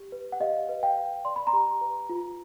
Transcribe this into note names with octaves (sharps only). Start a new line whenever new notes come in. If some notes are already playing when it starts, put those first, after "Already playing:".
Already playing: G4
B4
F#5
G4 D#5 F5
B4
F5 G5
B4
D5 C6
B5
A#5 C6
G4
B4
F4